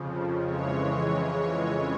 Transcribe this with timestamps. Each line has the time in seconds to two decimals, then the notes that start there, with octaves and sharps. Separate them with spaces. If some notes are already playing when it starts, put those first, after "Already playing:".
Already playing: F2 C#3 F3
0.40 F2 C#3 E3 G#3 C#5